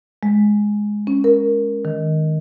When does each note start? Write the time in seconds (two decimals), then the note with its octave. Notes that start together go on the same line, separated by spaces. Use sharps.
0.23 G#3
1.07 C#4
1.24 A#4
1.85 D#3